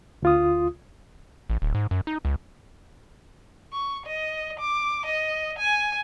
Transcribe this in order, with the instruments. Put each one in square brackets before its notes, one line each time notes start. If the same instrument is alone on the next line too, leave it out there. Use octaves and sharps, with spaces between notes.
[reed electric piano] D2 F4 D#6
[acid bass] A1
D1
G#2
F#2
D#4
C#2
[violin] C#6
D#5
D6
D#5
G#5